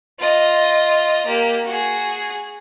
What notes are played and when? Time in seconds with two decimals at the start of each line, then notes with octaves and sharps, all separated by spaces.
0.19 F4 D#5
1.26 A#3 G4
1.66 F#4 G#4